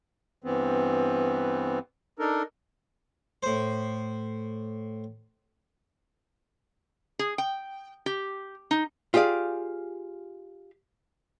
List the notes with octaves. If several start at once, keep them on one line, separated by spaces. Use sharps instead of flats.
G2 E3 B3 C4
D4 D#4 A4 A#4
A2 C5
G#4
G5
G4
D#4
F4 G4 G#4 D5 F5